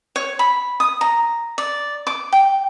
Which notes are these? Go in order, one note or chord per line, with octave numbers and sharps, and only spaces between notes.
C#5
B5
D#6
A#5
D5
D6
G5